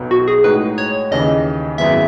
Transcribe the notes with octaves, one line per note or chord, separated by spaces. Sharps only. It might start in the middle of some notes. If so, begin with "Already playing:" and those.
Already playing: B1 B2 F#3 B3
F#4
G#4
A2 G#3 D#4 F#4 B4
C#5
D#2 C#3 E3 D#5
G#1 F#2 E3 G#3 B3 E5